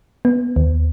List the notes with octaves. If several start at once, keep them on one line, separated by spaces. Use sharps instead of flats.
B3
D#2